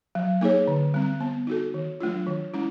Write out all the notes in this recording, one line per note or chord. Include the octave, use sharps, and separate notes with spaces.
F#3
A#3 D#4 G#4 C#5
D3
G3 C4
B3
D#4 F#4 A4
D#3
F#3 A3 D4 F4
D#3
G#3 C#4 E4